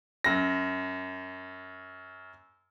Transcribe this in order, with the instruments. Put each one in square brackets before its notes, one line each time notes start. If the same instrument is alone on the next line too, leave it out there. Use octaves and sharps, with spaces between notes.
[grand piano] F#2 A#6